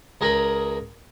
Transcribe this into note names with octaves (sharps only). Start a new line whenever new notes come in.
C#2 G#4 A#4 A#5 B5